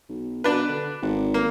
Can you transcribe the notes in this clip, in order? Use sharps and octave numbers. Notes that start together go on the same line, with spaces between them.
B1
B2 D4 B4
D3
G#1
A#3